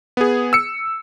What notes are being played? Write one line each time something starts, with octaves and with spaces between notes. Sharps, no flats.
B3 G#4
E6 C#7